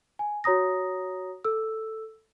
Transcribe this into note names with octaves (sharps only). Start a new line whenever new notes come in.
G#5
F#4 C#5 A#5 D#6 A#6
A4 E6